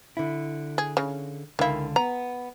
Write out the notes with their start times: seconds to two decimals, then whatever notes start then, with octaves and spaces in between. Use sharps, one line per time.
0.17 D3 E4
0.78 G#4
0.97 C#3
1.59 C#2 D3 D#3 E4 F5
1.96 B3 A#5